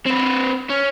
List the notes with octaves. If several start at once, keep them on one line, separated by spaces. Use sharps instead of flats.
C4 B4
C#4